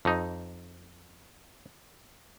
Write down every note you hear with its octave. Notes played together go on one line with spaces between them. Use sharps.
F2 D#4